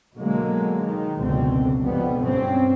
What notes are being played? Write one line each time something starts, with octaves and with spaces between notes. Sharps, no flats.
B2 D3 F#3 G#3 A#3
D#3
F#1 C#2 B2 D3 F#3 C4
B1 G2 B2 F3 G3 B3
G2 C4 C#4